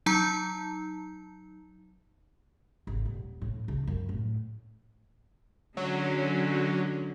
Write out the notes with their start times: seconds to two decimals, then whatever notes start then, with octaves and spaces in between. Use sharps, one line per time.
0.06 F#3 D#4 A5 A#5
2.87 G#1
3.05 D#1
3.42 A2
3.68 C#2
3.87 F#2
4.09 A2
5.77 D3 F#3 G#3 C#4